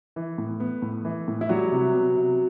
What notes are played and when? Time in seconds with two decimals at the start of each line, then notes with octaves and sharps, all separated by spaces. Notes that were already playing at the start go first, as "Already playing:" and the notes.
0.16 E3
0.38 A2
0.60 B3
0.82 A2
1.05 E3
1.28 A2
1.41 E4
1.49 F#3 G3 F#4
1.72 C3
1.94 B3
2.16 C3